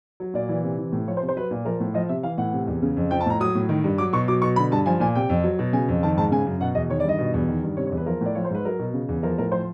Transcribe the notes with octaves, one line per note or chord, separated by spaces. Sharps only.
F#3
A#2 D5
E3
C3
E3
A2
F3 C#5
C5
C3
C5
F#3 B4
A#2
F3 A#4
A2
F3 D#5
C3 E5
E3 F5
A2 F#5
C3
E2
C#3
F2
F3 G5
A5
A2 A#5
F#3 D#6
A2
D#3
G2
F#3 D6
B2 C#6
F#3 D6
B2 C#6
D3 B5
G2 A5
F3 G#5
A#2 G#5
C3 G5
F2
F#3
B2
C#3 G#5
F2
D#3 A5
G#2 A5
C#3 G#5
F#2
B2 F#5
E2 D#5
D#3 C#5
D5
G2 D#5
B2
E2
D#3
G2
C3 C#5
C#5
E2
B4
F3 A#4
A2 D5
F3 C#5
C5
G#2 B4
F#3 A#4
B2
C#3
E2
F3 A#4
A2 A#4
F3 C5